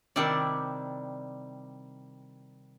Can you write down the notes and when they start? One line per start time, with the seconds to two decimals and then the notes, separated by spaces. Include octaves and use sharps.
0.16 C3 D#3 G3 E4 D5